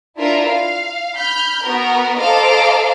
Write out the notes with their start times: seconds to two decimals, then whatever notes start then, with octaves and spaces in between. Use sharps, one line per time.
0.18 D4 E4 F4 A#4
0.48 F5
1.16 B5 F6 G6
1.64 B3 F#4 A#4
2.19 A4 C5 D#5 F5 A#5 D6